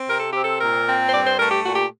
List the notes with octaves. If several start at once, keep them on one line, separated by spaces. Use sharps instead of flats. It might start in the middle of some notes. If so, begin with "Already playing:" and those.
Already playing: C4
C3 A#4
A4
C4 G4
A4
A#2 A#4
C4
C5
G2 D5
C5
A3 A#4
G4
A#2 F#4
G4